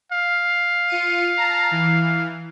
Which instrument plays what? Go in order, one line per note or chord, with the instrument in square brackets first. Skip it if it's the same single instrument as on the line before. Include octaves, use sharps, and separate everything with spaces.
[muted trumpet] F5
[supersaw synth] F4 C#7 D#7
A5 A#5
E3